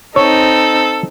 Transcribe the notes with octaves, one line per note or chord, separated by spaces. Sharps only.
C4 D#4 A4 C#5